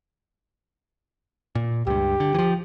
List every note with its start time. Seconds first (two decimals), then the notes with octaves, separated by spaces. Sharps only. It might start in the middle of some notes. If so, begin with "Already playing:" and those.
1.55 A#2
1.87 C#2 G2 G4
2.20 D3
2.34 E3 F3